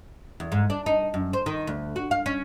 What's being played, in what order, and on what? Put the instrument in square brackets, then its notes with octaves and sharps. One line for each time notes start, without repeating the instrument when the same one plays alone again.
[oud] E2
G#2
D4
D#4
F#2
C5
D#3
D2
F#4
F5
C#4